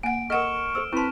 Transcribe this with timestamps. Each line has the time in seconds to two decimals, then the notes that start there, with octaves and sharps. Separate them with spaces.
0.03 A#3 F#5 G#5 D7
0.30 A4 A#4 D#5 F#5 C#6 F6 E7
0.75 A4 C5 E6
0.93 C4 E4 B4 A5 C6 C#6